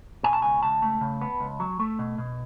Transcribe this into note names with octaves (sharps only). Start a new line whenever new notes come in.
B2 G#5
A5
C#2 G#5
C#2 A5
A3
C#3
B3
C#2
F#3
A3
B2
B2